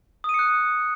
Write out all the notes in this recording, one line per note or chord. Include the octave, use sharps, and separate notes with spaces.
D#6 F#6 C#7 D#7